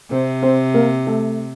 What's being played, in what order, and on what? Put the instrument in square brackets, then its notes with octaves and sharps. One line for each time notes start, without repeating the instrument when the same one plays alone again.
[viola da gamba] C3 [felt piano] C4 C5
[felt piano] C4 C5
A#3 A#4
A3 A4